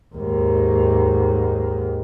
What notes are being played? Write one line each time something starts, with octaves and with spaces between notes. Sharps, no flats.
D#2 G#2